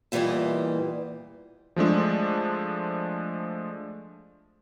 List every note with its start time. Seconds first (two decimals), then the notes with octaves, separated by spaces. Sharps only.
0.12 E2 A#2 E3 G3 D5 D#5
1.76 F3 G#3 A3 D4